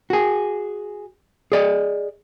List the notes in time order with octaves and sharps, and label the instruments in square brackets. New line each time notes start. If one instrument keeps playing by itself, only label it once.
[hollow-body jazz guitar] F#4 G#4
G#4 D5 D#5